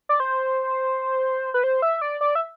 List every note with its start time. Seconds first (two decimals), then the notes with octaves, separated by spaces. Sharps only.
0.09 D5
0.20 C5
1.54 B4
1.64 C5
1.82 E5
2.01 D5
2.21 D5
2.35 E5